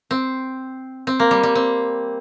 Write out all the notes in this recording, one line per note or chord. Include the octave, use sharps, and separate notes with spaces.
C4
C4
A#3
G3
G3
C4